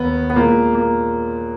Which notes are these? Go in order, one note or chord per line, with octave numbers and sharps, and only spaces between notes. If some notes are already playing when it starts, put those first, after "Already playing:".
Already playing: D#2 B3
B3
A#2 G#3 A#3
A#3